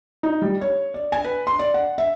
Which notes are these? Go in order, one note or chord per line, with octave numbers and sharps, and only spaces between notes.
D#4
G3
C#5
D5
G#5
B4
C6
D5
F#5
E5